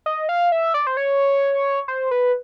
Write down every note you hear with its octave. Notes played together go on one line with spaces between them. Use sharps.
D#5
F5
E5
D5
C5
C#5
C5
B4